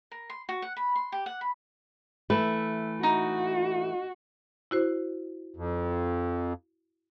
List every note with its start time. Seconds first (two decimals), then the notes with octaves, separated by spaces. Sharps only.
0.11 A#4
0.30 C6
0.49 F#4
0.62 F#5
0.77 B5
0.96 C6
1.12 G4
1.26 F#5
1.41 B5
2.30 E3 A3 B4
3.03 D#4 F#4
4.71 E4 F#4 C5
5.56 F2